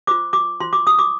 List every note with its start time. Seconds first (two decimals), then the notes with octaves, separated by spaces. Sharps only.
0.07 F4 C5 D6
0.33 D6
0.60 F4 C5 C6
0.73 D6
0.87 D#6
0.99 D6